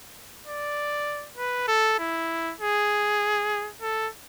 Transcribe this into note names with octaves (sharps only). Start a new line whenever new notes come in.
D5
B4
A4
E4
G#4
A4